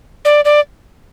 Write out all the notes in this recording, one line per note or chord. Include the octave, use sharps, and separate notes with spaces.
D5
D5